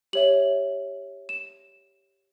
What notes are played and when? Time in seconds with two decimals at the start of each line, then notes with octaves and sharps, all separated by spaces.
0.13 G4 C#5 E5 F#7
1.29 E7